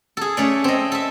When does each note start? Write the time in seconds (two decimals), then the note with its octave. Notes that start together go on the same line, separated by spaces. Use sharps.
0.17 G#4 A4
0.37 A3 C#4 D5
0.64 C4 D#5
0.92 A4 E5